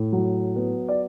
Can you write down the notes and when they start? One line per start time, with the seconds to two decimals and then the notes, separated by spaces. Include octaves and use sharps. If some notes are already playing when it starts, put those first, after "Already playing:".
Already playing: A2
0.12 F#3
0.56 B3
0.89 D5